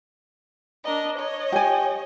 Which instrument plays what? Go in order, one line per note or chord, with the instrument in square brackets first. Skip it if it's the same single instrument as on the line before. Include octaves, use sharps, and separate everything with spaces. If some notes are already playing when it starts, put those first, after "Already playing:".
[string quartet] D4 A#4 D#5
C#5 D#5
[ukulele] G4 G#5